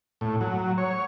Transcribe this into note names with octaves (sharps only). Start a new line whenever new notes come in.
A2
F#3
C#5